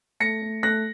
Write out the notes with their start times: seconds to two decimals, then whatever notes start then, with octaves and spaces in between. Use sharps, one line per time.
0.20 A3 A#6 C#7
0.42 A3
0.63 A3 F#6 A#6